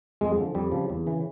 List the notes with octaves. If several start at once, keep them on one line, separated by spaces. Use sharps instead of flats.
F2 G#3
D3 F3
F2 G3
C#3 F3
E2
C#3 E3